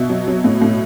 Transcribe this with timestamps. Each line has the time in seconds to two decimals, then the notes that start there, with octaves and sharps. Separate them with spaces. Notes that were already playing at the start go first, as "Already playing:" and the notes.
Already playing: B2 E5
0.10 F#3
0.28 F#3
0.44 A2
0.62 A2